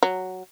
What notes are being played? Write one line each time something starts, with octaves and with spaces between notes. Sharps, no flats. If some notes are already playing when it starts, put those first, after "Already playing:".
F#3